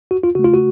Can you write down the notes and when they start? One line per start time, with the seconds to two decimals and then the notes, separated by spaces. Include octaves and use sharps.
0.11 F#4
0.23 F4
0.35 C#3 A3 F#4
0.44 F4
0.54 F#4